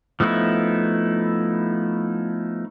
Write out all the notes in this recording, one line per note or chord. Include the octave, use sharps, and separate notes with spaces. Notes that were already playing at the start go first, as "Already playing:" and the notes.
F3 A3 B3 D#4 E4